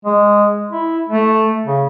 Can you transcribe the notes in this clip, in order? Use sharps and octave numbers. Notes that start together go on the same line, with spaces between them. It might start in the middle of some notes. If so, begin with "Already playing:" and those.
G#3
E4
A3
C#3